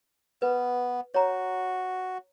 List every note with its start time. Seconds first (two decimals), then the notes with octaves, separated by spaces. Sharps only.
0.42 B3 B4
1.14 F#4 C#5 A#5